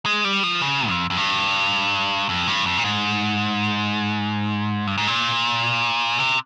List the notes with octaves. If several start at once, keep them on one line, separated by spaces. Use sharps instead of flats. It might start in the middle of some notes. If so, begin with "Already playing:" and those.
G#3
G3
F3
C#3
F2
F2
G2
F2
G2
F2
A#2
G#2
G2
G#2
A#2
C3